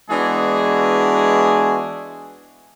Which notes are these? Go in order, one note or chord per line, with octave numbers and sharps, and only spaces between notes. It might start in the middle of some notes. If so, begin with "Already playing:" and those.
E3 G#3 B3 D4 F#4 G#4